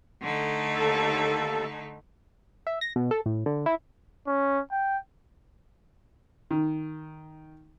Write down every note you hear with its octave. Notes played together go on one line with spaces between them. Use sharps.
D3 A3 D#4
D#2 A4
E5
A#6
B2
A4
A2
D3
E4
C#4
G5
D#3